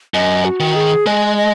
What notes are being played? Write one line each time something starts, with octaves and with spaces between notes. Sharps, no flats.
F#2 D#5
F#4
D#3
G#4
G#3 D#5
D#5